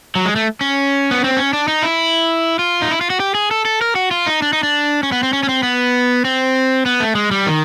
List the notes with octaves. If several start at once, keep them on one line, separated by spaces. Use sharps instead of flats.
F#3
G#3
A3
C#4
B3
C4
C#4
D4
D#4
E4
F4
D#4
E4
F4
F#4
G4
G#4
A4
A4
A#4
F#4
F4
D#4
D4
D#4
D4
C#4
B3
C4
C#4
C#4
C4
B3
C4
B3
A3
G#3
G3
D#3